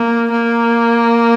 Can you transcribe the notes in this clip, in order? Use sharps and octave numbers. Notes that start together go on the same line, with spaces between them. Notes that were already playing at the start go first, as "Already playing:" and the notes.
Already playing: A#3
A#3